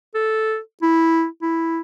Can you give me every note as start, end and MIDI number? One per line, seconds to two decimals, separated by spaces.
0.15 0.58 69
0.82 1.26 64
1.42 1.81 64